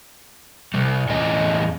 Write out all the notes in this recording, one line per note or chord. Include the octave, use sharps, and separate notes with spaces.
C3 G3
E2 A2 C#4 C#5 D#5 G#5